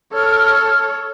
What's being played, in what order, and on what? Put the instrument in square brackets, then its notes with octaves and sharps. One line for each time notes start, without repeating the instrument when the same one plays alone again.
[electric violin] A4 C#5 [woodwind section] F6